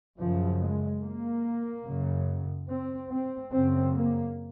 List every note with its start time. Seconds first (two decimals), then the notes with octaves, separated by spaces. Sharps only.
0.18 F#2 C#3 F3
0.59 G#3
1.02 A#3
1.85 F#2 C#3
2.68 C4
3.10 C4
3.52 F#2 C#3 C4
3.93 A#3